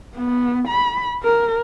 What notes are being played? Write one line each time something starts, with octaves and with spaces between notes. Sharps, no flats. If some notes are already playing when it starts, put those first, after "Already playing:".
B3
B5
A#4